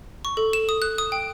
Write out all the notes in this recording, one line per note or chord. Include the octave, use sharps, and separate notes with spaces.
C#6
A4
E7
D#6
F#6
D#6
G5